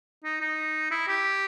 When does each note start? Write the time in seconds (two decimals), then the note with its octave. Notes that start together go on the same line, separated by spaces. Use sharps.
0.25 D#4
0.41 D#4
0.91 E4
1.08 G4